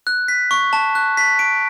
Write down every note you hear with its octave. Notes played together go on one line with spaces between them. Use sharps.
F#6
B6
C#6
A5
F#6
B6
D7